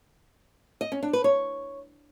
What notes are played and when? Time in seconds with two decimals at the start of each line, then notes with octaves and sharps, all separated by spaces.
0.81 D#5
0.92 C#4
1.03 D4
1.13 B4
1.24 C#5